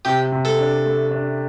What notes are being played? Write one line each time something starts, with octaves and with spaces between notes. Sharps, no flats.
C3 G4
C3
A4
D4
A3
D4